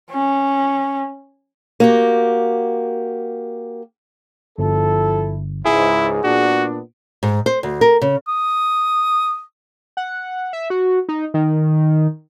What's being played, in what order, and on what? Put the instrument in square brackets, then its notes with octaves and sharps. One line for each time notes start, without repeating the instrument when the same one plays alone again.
[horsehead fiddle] C#4
[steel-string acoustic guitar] A#3 F#4 G4
[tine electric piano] G1 [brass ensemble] F3 E4 A4
[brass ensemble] C#2 G#2 [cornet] E4 [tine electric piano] G#4
[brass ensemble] A#2 B3 D4 [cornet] F#4
[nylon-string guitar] G#2
C5
D2
A#4
C#3
[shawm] D#6
[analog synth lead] F#5
E5
F#4
D#4
D#3